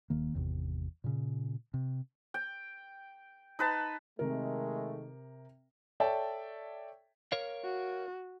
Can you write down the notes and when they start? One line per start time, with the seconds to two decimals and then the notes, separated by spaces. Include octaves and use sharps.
0.10 D#1 D#3 A#3
0.34 G#1 E2 C3
1.04 A#2 C#3
1.74 C3
2.34 G5
3.59 D#4 B4 A5
4.19 C3 D#3 G#3 A3 A#4
6.00 A4 C#5 D5 E5 G5 A5
7.32 A#4 C#5 F5
7.65 F#4